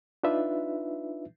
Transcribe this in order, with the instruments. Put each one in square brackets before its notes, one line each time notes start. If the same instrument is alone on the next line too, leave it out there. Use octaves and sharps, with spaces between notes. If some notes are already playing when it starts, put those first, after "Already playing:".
[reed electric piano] D4 D#4 F4 B4 E5